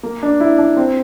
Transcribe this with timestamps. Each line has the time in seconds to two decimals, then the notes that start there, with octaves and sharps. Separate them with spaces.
0.03 A#3
0.23 D4
0.41 E4
0.58 D4
0.77 C4